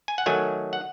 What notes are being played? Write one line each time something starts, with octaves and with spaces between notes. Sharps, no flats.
G#5
F#5
D#3 F#3 A3 G#5
F#5